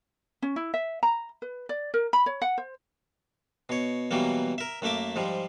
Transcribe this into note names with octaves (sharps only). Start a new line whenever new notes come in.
C#4
E4
E5
A#5
B4
D5
A#4
B5
C#5
F#5
C5
B2 C#5
B2 E3 F#3 G3 A#3
A#4 E5
F#2 A3 A#3 E5 D6
G#2 F3 G3